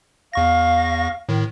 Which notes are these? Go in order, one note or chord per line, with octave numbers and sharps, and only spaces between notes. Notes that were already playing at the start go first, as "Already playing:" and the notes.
E2 F5 C#6 A#6
A2 D#3